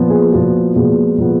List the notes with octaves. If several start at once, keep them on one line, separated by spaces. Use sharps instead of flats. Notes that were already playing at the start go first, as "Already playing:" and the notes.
Already playing: A#2 F3 B3
G#4
A#2 F3 B3 F#4
A#2 F3 G#3 B3
A#2 F3 G#3 B3